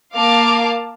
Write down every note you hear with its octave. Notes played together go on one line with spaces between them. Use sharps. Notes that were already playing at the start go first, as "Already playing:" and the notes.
A#3 F5 A5 D6